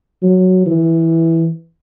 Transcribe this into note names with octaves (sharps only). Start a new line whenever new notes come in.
F#3
E3